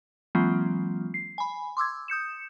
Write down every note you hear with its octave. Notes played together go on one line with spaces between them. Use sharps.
E3 F#3 G#3 A#3 C4 F4
C7
G#5 B5
C6 D6 E6 G#6
D#6 G6 C#7 E7